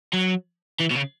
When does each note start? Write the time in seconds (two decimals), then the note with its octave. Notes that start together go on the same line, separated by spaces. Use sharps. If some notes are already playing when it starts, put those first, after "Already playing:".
0.13 F#3
0.80 E3
0.90 B2
0.95 C#3